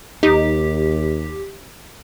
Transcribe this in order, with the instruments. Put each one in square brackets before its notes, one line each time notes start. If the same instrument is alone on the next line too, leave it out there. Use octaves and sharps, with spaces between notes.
[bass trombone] D#2 [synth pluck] D#4 [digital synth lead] G4